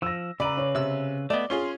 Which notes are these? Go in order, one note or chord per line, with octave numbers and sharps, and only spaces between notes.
F3 E6 A#6
C#3 B4 D5 A#5 B5
C#5
C3 E6
A3 B3 D5 D#5
C#4 F4 G#4 C6